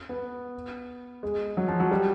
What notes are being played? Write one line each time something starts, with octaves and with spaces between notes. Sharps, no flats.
B3
G#3
F#3
F3
F#3
G3